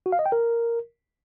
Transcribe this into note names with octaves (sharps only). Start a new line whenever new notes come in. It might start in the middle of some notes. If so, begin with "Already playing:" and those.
F#4
F5
D#5
G5
A#4